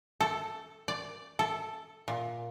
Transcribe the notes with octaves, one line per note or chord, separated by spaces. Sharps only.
A4
D5
A4
A#2